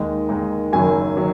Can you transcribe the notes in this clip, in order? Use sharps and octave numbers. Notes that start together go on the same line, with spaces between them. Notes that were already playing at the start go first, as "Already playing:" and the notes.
Already playing: D#2 D#3 G#3 D#4 D#5
D#2 D#3 G#3 D#4
F#1 F#2 D#3 F#3 G#5
D#3 F#3